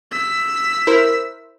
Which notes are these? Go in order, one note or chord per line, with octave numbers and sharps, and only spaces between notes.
E6 B6
E4 A#4 C5